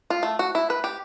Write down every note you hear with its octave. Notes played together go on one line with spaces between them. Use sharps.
F4
A3
F#4
E4
B4
G4